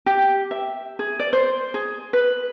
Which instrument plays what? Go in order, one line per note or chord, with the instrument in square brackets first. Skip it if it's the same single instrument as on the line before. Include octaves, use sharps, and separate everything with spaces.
[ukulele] G4
E5
G#4
D5
C5
G#4
B4